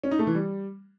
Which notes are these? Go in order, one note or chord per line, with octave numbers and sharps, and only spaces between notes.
C#4
D#4
A3
E3
G3